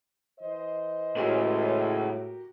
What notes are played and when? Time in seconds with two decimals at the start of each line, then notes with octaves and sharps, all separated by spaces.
0.40 E3 C5 D#5
1.16 A2 C#3 G#3 F#4 G4 A#4